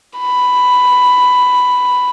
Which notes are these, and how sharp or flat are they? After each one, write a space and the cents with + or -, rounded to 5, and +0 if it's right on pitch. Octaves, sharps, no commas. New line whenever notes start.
B5 +5